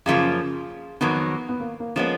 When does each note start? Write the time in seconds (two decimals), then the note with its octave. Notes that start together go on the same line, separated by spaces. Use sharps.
0.06 F#2 C#3 F3 A#3 C#4 F4 G#4
1.01 F2 D#3 F#3 A#3 B3
1.49 B3
1.60 A#3
1.80 A#3
1.96 F3 G#3 A#3 B3 C#4